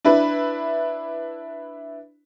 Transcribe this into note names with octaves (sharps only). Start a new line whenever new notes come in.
D4 E4 B4